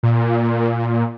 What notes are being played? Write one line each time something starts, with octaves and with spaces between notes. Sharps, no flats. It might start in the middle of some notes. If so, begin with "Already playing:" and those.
A#2